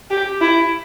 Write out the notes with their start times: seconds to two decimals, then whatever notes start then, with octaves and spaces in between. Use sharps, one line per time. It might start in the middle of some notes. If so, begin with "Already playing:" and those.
0.11 G4
0.41 E4